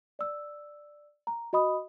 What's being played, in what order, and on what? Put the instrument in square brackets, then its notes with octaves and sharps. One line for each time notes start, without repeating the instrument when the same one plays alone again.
[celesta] D5 E6
A#5
F#4 D#5 B5 D#6